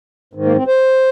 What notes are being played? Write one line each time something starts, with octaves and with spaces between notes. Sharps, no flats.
G#2 D#3
A#3
C4
C5